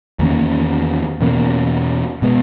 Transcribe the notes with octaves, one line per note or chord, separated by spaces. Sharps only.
E2 D#3 A#3 C#4
E2 B2 A#3 C#4
B2 G#3 B3